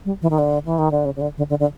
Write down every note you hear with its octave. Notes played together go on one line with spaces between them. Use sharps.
G3
E3
D#3
D3
E3
D#3
D3
C#3
C#3
D3
D3
D3
D3